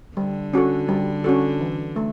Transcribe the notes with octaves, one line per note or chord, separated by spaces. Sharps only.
D3 G3
C#4 F#4 A4
G3
C#4 F#4 A4
E3
A3